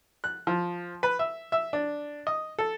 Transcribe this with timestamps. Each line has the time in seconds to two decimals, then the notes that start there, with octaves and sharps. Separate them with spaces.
0.24 F#6
0.47 F3
1.03 B4
1.19 E5
1.52 E5
1.73 D4
2.27 D#5
2.59 A4